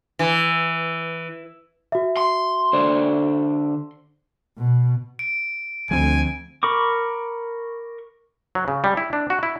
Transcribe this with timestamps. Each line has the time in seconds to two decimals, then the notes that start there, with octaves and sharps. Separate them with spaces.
0.19 E3
1.92 F#4 E5
2.17 C6
2.73 D3 C5 D5
4.58 B2
5.19 D7
5.91 D2 F3 C4 G#5
6.63 A#4 B5 C#6 D6
8.55 F#3
8.68 C#3
8.84 G3
8.97 E4
9.13 D4
9.30 F#4
9.43 E4